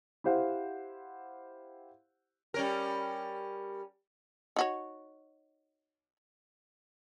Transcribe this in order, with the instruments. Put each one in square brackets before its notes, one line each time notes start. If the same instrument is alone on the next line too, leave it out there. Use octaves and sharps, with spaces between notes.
[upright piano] E4 G4 C5 F5 F#5
[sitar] G3 C#4 A#4
[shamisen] D#4 F#4 C#5